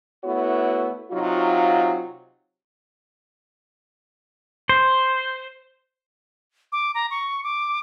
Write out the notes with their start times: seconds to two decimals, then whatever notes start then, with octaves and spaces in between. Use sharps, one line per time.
0.24 A3 B3 E4 F#4 C#5
1.12 C3 F#3 D#4 F4
4.69 C5
6.72 D6
6.95 A#5
7.11 C#6
7.44 D6